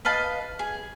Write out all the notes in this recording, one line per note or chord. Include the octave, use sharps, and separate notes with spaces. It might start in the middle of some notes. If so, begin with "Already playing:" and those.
B4 D#5 F5 A5
G#4